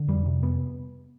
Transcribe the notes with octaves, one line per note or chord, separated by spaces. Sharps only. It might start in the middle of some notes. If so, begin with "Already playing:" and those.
Already playing: D3
F2 G3
C3
F2 B3